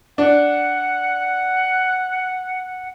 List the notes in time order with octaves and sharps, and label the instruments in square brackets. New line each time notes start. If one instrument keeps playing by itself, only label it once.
[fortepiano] D4 [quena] F#5